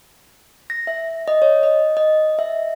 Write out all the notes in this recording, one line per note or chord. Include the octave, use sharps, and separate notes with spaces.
A#6
E5
D#5
C#5
D#5
D#5
E5